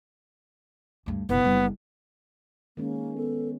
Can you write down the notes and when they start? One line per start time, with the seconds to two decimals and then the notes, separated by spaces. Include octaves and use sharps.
1.06 D2 G2
1.29 F#1 B1 B3
1.44 F#1 G3
2.77 D#3 G#3 A#3 C#4
3.17 B3 A4